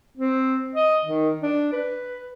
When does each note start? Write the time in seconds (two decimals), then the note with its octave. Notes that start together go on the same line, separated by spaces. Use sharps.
0.17 C4
0.75 D#5
1.05 D#3
1.43 D4
1.73 B4